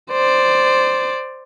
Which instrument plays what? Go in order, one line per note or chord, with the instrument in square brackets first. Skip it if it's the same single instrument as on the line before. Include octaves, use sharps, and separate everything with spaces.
[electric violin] C5 D5